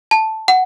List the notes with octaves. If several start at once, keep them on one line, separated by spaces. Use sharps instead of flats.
A5
F#5